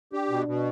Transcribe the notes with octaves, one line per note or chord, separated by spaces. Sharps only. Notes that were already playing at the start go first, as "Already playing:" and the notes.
D4 G4
B2
B2